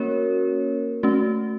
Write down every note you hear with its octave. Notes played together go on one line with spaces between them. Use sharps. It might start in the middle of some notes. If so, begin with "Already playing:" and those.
Already playing: A#3 C#4 F#4 A#4 C#5
A3 C#4 F#4